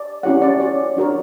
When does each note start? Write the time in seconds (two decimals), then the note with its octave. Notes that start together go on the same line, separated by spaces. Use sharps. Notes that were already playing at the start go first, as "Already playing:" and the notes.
Already playing: D5
0.23 C#4 E4 G4 C#5 F#5
0.42 D5
0.60 F#4 C#5 D5
0.97 D4 F#4 A#4 C#5